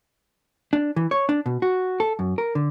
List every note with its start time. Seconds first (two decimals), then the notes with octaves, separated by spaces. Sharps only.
0.73 D4
0.96 E3
1.11 C#5
1.29 D4
1.46 B2
1.62 F#4
2.00 A4
2.19 F#2
2.38 A#4
2.55 D3